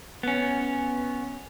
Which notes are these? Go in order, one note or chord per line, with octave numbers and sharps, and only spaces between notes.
B3 C#4